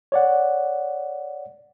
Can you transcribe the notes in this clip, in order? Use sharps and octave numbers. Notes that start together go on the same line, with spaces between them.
C#5 D5 F#5